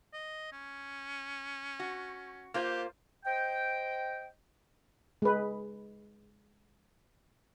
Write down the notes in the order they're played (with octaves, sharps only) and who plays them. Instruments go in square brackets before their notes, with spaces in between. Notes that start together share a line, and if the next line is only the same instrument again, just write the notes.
[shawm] D#5
C#4
[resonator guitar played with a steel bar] F#4
[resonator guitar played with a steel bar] A#3 F4 C5 [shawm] G4
[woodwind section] C5 D#5 G5
[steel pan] G#3 B4